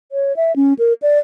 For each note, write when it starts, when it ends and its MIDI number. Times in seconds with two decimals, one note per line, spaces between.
0.12 0.35 73
0.36 0.55 76
0.56 0.73 61
0.79 0.93 70
1.02 1.19 74